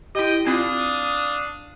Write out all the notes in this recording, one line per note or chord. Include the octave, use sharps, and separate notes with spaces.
E4 G4 D#5 G5
C4 D4 F4 F5 D#6